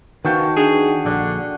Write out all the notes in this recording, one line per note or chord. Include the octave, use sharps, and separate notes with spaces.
D#3 F#4 B4 C5 F5 G5 A5
D4 G#4
A#1 D3